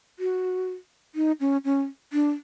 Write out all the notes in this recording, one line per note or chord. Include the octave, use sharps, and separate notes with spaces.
F#4
D#4
C#4
C#4
D4